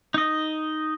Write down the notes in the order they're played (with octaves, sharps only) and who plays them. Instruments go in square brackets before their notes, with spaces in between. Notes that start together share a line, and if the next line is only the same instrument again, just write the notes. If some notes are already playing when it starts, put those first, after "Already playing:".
[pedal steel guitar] D#4 D#5